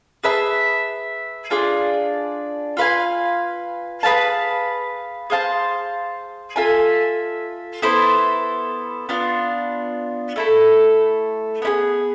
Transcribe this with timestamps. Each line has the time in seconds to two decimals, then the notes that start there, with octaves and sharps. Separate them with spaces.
0.24 G#4 B4 E5 A5
1.50 D4 F4 G#4 D5
2.77 F4 B4 F5 G#5
4.03 G#4 B4 F5 A5
5.30 G#4 C5 F5 A5
6.56 F4 A4 E5 G#5
7.82 B3 E4 A4 C5
9.09 B3 D4 F4
10.36 A3 E4 A4
11.62 B3 E4 G#4